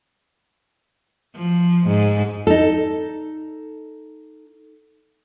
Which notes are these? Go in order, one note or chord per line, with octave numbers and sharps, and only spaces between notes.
F3
G#2
D#4 A4